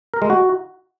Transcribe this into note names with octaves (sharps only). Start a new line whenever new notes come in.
A#4
G#3
F#4